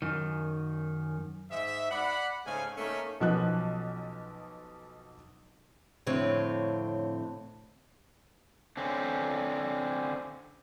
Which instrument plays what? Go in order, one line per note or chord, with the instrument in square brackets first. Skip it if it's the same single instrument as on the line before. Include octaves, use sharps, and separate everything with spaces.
[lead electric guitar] F#2 D#3
[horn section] G#2 E5
D5 F#5 B5
G#2 C#3 G#3 A3 F5 G#5
A3 A#3 C#4 D#4 C#5 E5
[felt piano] B1 B2 F3 B3 C#4 F#6
[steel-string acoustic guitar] F2 A2 D3 C4 C#5
[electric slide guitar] D3 C4 C#4